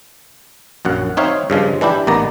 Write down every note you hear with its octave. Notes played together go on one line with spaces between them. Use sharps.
A#1 F#2 F#5
C4 D#4 C#5 E5 F5
G2 C#3 F3 G#3
E3 D4 E4 G4
A1 D#2 D#3 B3 D5 A#5